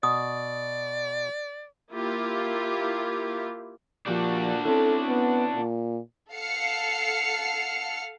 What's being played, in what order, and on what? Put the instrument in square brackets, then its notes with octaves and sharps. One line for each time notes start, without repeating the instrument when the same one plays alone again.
[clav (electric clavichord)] B2 [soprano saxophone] D5 [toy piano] D#6
[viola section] A#3 E4 F4 G4
[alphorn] A#2 [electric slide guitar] F3 G4 [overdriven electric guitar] D4 F#4
[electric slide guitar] C4 C#4 E4 [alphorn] A4
[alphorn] B3
A#2
[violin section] A4 F5 F#5 F6 C7 C#7